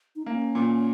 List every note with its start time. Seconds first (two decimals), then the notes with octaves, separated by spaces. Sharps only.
0.16 D#4
0.26 A#3 C#4
0.55 A#2